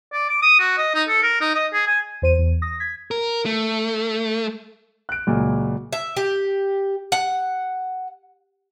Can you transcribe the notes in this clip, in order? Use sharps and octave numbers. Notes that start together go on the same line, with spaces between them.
D5
D6
D#6
F#4
D#5
D#4
A4
A#4
D#4
D#5
G#4
G#5
E2 C5 D#7
E2
D#6 A#6
G#6 B6
A#4
A3
F#6 D7
C#2 A#2 F#3
E5
G4
F#5